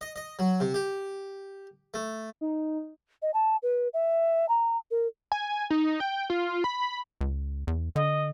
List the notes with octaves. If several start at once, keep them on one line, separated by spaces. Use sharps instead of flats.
D#5
D#5
F#3
C3
G4
A3
D#4
D#5
A5
B4
E5
A#5
A#4
G#5
D#4
G5
F4
B5
C#2
E2
D3 D#5